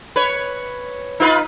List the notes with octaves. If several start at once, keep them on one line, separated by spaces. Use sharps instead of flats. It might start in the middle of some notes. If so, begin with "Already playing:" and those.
B4 C#5
D#4 F4 B4